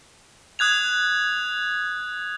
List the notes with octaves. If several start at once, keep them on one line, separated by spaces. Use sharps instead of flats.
D#6 F#6 G#6 F7